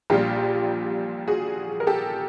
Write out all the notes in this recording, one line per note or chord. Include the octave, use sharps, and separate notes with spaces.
A#1 A#2 G3 F4 G4
F#4 G#4
A#4
G4 A4